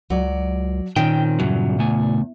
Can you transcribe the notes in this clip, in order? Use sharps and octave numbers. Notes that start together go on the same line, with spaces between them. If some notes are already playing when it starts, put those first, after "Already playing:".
C#2 F#3 D5
A#2 D#3 C4 C#4 G5
E2 G2 C#3 F#3
C#3 A3 G#5